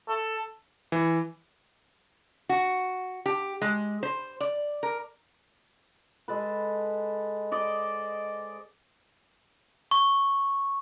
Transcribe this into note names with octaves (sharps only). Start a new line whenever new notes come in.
A4
E3
F#4
G4
G#3
C5
D5
A#4
G#3 A4 B4
C5 D5 D#5
C#6